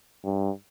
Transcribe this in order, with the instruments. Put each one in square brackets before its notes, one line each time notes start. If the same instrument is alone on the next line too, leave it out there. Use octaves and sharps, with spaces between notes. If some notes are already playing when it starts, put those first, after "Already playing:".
[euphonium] G2